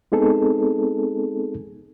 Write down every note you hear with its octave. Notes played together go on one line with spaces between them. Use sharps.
G#3 B3 C4 D#4 G#4 A4